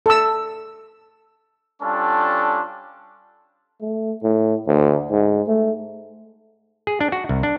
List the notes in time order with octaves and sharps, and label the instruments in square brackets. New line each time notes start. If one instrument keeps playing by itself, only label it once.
[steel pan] A4 E6
[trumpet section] G3 C#4 D4 F4 A4
[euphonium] A3
A2
D2
G#2
A3
[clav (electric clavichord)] G#4
D4
F#4
C2
D4